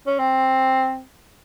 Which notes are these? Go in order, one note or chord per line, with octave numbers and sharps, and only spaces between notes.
C#4
C4